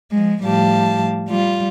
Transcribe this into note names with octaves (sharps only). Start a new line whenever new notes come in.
F3 G#3
A2 F3 G3 G4 F5 A5
G3 F4